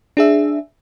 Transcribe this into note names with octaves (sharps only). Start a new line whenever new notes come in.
D4 G#4 E5